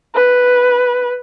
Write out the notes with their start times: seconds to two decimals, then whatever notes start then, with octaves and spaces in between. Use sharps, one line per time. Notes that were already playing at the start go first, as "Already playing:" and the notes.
0.15 B4